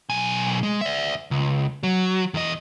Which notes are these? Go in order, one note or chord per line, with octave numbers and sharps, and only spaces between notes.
B1 G#5
G#3
D5 E5
C#2
F#3
E2 D#5